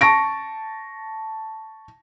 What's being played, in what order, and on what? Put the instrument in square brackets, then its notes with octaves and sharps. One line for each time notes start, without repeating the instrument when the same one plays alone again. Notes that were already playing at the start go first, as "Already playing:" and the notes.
[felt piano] A5 C#6 A#6 D7